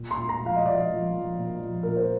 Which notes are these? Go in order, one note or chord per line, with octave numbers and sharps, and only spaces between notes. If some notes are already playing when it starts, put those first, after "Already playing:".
Already playing: A#2
C6
A#2
A#5
F3
F5
D#5
F3 D5
D#5
F3
F3
A#2
F3
A#2 A#4
C5